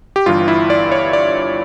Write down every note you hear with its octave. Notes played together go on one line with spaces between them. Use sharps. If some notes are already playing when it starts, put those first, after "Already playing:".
G4
G1 G2 E3 F4
E4
D5
C#5
D5